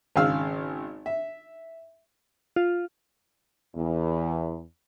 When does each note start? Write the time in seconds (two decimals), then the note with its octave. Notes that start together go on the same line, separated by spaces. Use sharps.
0.16 G#1 C#3 G#4 F5 E6 F6
1.06 E5
2.56 F4
3.75 E2